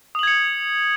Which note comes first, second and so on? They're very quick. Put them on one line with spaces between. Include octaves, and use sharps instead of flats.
D#6 F#7 G#6 C#7